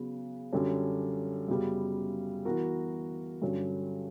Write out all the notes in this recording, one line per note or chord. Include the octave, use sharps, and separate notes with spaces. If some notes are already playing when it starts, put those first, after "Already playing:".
Already playing: C#3 F#3 B3
F#2 D3 G3 C#4
F#2 C#3 G3 B3
E3 B3 F#4 A#4
G2 D3 F#3 C#4